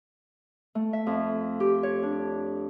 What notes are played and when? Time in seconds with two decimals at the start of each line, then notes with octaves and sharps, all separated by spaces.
0.75 A3
0.93 E5
1.07 F2
1.60 G4
1.83 C#5
2.03 D4